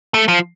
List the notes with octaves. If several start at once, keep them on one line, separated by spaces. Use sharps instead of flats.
A3
F3